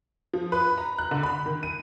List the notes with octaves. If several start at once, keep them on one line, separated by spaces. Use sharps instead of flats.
F3
B4
A#5
F#6
D3
B5
D#3
D#7